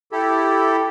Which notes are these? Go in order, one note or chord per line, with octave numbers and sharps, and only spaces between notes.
E4 G4 A4